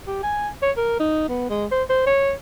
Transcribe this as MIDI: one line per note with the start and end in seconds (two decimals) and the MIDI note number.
0.07 0.23 67
0.23 0.48 80
0.62 0.71 73
0.77 0.99 70
1.00 1.28 63
1.29 1.49 59
1.50 1.66 56
1.72 1.83 72
1.89 2.02 72
2.07 2.33 73